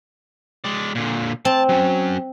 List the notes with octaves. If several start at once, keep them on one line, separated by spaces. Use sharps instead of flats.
G#3 D5
A#2 D3
C4 A5
F#3 C#4